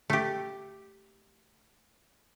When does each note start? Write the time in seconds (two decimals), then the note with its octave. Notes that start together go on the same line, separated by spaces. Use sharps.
0.10 A3 G4